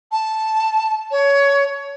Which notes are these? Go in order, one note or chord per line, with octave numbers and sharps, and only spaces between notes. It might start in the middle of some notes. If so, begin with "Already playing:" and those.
A5
C#5